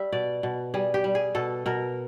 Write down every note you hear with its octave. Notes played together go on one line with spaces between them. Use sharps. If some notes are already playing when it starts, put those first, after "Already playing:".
Already playing: G3 E5
B2 D5
B2
G3 G#4
G4
G3
G#4
B2 A4
B2 A#4